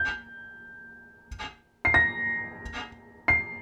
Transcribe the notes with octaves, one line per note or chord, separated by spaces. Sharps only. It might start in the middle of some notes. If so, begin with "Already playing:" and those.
Already playing: G6
C7
A#6
C7